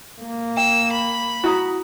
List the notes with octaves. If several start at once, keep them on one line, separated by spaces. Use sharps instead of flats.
A#3
G5 E6
B5
E4 F#4 A#5 D#6